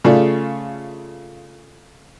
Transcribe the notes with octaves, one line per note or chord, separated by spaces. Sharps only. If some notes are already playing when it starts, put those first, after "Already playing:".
C#3 A3 F4 D5 F5